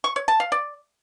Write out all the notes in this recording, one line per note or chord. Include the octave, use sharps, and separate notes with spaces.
C#6
C#5
A5
F5
D5